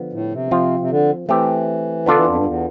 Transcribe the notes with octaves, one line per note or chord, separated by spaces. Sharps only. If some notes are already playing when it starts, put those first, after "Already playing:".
Already playing: D3 F3 B3
A2
C3
F3 C4 F4
C3
D3
E3 A3 C4 G4
D3 B3 D4 F4 A4 D5
E3
F2
G2
E2